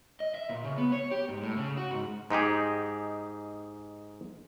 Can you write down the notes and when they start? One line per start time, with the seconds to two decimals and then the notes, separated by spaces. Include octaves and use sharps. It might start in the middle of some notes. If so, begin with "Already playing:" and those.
0.20 D#5
0.35 E5
0.49 A#2
0.64 C#3
0.78 B3
0.92 C#5
1.11 G4
1.28 G#2
1.43 A2
1.57 C#3
1.77 F#4
1.91 G#2
2.30 G#2 D#4 G4 G#4